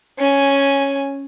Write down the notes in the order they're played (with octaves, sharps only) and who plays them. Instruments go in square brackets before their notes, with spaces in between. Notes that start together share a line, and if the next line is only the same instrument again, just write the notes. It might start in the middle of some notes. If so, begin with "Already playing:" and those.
[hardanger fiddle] C#4 G#5